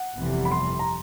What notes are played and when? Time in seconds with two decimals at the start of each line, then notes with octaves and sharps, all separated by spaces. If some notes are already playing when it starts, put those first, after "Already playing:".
Already playing: F#5
0.16 G1 F2 C3 E3 G3
0.45 B5
0.51 C6
0.79 A#5